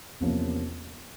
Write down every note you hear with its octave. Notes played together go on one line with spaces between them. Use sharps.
E2 C3 F3 A#3 C#4